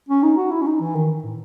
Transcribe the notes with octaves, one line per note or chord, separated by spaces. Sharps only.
C#4
D#4
F#4
E4
C#4
D#4
E3
D#3
A2